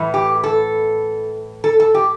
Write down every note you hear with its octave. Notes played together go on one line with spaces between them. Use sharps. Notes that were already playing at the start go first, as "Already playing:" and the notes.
Already playing: A2 E3
G4
A4
A4
A4
G4